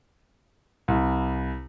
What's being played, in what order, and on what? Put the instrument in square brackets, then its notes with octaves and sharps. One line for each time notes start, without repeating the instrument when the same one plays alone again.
[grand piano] C2